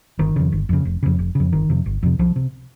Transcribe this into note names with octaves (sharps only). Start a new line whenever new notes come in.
G1 D#3
F2 C#3
G1
F2 C#3
F1
F2 C#3
F1
F2 C#3
G1 D#3
F2 C3
G1
F2 C3
C2 F3
C3